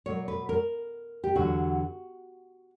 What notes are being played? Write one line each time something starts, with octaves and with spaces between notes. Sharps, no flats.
B2 F#3 A#3 C#5
B4
A#4
G4
E2 D3 F#3 F#4